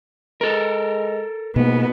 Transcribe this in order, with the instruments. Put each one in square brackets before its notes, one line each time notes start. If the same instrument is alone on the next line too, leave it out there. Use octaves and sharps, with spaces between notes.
[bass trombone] G#3 [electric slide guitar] A4 A#4
[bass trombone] G#2 [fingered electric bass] B2 A#3 [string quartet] B3